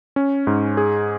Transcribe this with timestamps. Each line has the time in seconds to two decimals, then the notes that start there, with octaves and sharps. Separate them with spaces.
0.16 C#4
0.47 G#2
0.77 G#4